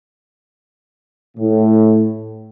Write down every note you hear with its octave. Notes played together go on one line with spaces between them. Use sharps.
A2